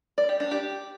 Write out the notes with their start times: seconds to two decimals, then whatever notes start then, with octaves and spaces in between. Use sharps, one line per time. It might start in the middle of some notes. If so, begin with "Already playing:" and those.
0.18 D5
0.29 G4
0.40 D4
0.51 G4